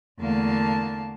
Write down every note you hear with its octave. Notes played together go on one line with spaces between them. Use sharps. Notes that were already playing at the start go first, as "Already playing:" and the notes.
E2 D3 A3 A#3 F5 A5